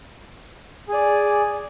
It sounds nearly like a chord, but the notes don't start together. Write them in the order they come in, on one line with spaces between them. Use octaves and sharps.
G#4 G#5 D5